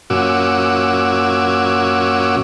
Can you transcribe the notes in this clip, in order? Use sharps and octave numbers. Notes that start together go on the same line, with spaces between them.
F#2 A#2 C#4 F#4 D6 E6